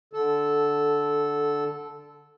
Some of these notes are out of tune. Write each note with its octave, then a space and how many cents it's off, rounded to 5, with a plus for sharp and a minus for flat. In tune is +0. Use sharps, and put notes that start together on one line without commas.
D3 +0 A4 -10